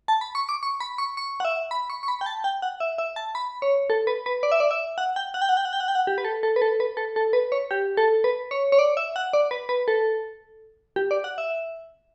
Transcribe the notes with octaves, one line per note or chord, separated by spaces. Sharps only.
A5
B5
C#6
D6
C#6
B5
C#6
C#6
F#5
E5
B5
C#6
C#6
B5
G5
A5
G5
F#5
E5
E5
A5
B5
C#5
A4
B4
B4
D5
E5
D5
E5
F#5
G5
F#5
G5
F#5
G5
F#5
G5
F#5
G5
F#5
G4
B4
A4
A4
B4
A4
B4
A4
A4
B4
C#5
G4
A4
B4
C#5
C#5
D5
E5
F#5
D5
B4
B4
A4
G4
D5
F#5
E5